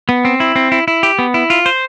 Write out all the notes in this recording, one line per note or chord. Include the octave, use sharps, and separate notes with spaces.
B3
C4
E4
C4
E4
E4
G4
B3
E4
F4
C5